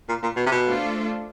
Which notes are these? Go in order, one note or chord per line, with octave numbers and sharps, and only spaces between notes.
A#2
A#2
B2
C3
B2
A3 D4 F4 A4 C5